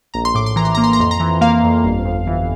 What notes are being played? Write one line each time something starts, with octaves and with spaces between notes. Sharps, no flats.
A#1 A#5
C6
A2 D6
C6
E3 A#5
C6
A#3 A#5
C6
A#5
F2 C6
A#5
E3
A#3 F5
F2
G1
F2
E3